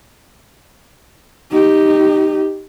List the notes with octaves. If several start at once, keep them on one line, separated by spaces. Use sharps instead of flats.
D#4 G4